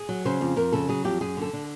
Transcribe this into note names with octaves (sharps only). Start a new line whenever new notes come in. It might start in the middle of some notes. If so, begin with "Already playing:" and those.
Already playing: G#4
F#3
C#3 C5
F2
F2 A#4
C#3 A4
F#3 G#4
F2 G4
F#2 G#4
D3 A4
D3